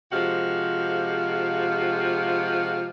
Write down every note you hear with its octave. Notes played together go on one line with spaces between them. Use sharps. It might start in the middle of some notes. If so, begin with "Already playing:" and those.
C3 F3 G#3 F#4 G4 F5